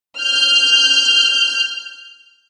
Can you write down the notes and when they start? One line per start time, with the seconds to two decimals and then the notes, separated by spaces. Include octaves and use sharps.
0.18 F6 G6